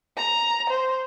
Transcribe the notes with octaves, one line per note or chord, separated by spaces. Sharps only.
A#5
C5